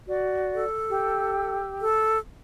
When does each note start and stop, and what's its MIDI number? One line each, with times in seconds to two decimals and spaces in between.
0.08 0.66 66
0.08 0.66 74
0.54 1.59 69
0.90 1.85 67
0.90 1.85 88
1.81 2.18 69